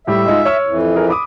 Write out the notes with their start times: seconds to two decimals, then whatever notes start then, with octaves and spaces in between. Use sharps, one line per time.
0.07 A2 G3 G4 E5
0.26 G#3 D#4 F4
0.45 C#5 E6 F6
0.67 F2 E3
0.94 G#4 A#4
1.09 B5 D6 D#6